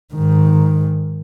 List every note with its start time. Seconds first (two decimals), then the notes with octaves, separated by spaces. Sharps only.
0.14 G#2 D#3